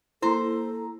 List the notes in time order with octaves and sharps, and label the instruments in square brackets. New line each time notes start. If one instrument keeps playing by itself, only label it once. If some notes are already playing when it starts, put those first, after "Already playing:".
[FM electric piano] A#3 A#5 [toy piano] E4 [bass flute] A4 [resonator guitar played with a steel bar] C5